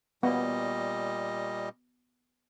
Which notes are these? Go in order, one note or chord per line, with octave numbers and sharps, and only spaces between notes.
A#2 G3 B3 D#5